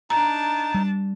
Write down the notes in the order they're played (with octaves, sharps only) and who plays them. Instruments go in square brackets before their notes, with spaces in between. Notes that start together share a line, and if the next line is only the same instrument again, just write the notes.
[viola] D4 A5 [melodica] D#4 [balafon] A#5
[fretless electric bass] G3